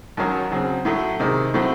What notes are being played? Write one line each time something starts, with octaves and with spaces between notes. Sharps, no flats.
D#2 D#3 F#3 C#4
C#3 F#3 C4
A2 F#3 A3
C3 D#3 G#3
A2 F#3 A3 C4